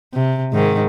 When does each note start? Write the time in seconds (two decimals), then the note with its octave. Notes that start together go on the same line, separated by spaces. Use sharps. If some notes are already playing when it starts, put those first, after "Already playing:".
0.14 C3
0.52 G#2 D#3